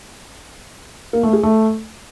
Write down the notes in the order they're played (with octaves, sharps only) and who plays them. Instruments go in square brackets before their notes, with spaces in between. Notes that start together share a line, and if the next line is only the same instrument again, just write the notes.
[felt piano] A#3
A3
G#4
A3